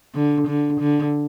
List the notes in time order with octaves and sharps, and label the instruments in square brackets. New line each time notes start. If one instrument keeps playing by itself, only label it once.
[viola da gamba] D3
D3
D3